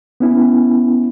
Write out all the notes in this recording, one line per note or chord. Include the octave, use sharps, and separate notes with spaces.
B3 C#4 E4